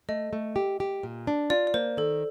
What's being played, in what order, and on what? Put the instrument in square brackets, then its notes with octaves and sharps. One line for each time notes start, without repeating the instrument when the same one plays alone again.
[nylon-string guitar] A3 [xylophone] D#5
[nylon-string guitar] A3
G4
G4
A#2
D4
[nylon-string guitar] F4 [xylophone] D5
[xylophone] D5
[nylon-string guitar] A#3 [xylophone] C5
[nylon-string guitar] D#3 [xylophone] A4